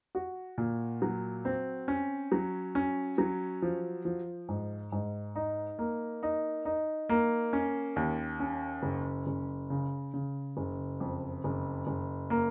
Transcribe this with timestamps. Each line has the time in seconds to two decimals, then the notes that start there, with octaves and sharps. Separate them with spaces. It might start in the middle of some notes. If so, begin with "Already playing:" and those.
0.15 F#4
0.58 A#2
1.02 F#3
1.45 C4
1.88 C#4
2.32 F#3
2.75 C#4
3.18 F#3
3.62 F3
4.05 F3
4.49 G#2
4.92 G#2
5.36 D#4
5.79 A#3
6.23 D#4
6.65 D#4
7.09 A#3
7.53 C#4
7.96 D#2
8.40 C#4
8.83 F#1
9.27 F#1
9.70 C#3
10.14 C#3
10.57 F#1
11.00 F2
11.44 F#1
11.87 F#1
12.30 A#3